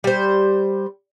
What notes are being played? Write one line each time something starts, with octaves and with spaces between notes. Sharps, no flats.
G3 C5